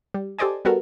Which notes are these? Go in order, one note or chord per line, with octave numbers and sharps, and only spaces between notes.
G3
G4 A4 C5 D5 D#5 G#5
G3 B3 F#4 A4 A#4